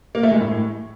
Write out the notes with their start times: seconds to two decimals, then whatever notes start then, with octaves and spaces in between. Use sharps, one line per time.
0.15 A#3
0.23 A3
0.32 G#3
0.41 A2